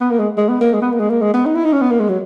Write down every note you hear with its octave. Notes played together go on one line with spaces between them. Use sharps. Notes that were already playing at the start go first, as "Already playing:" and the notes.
B3
A#3
G#3
G#3
B3
A#3
G#3
B3
A#3
G#3
A#3
G#3
B3
D#4
E4
D#4
C#4
B3
A#3
G#3
F#3